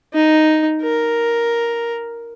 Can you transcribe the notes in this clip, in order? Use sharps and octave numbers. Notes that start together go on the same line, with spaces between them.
D#4
A#4